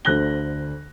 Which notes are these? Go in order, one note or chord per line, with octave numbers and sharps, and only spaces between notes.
D2 D3 C5 F#6 A#6 G7